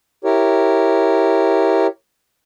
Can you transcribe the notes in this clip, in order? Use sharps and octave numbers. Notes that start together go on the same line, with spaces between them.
E4 G4 A#4 C#5